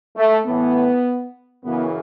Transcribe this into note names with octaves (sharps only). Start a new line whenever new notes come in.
A3
A2 E3 B3
F#2 C#3 E3 B3